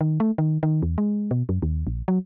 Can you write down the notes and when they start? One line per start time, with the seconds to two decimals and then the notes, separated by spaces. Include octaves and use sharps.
0.01 D#3
0.20 A3
0.38 D#3
0.63 D#3
0.83 E2
0.98 G#3
1.31 B2
1.49 F#2
1.62 D#2
1.87 A#1
2.08 F#3